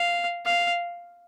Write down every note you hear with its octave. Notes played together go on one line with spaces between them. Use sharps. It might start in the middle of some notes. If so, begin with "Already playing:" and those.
Already playing: F5
F5